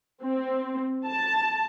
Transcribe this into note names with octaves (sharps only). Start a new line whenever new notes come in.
C4
A5